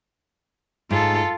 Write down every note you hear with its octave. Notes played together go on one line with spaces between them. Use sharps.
G#2 F4 A4